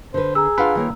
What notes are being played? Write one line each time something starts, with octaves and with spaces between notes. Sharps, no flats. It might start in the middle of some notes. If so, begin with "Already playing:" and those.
D3 B4 C5
G#4 A#5 E6
D4 F4 B4 F5 F#5
D#3 A#3 C#5